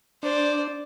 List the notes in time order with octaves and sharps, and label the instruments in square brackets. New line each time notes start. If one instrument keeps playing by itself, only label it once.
[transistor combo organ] D4 [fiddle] C5 D5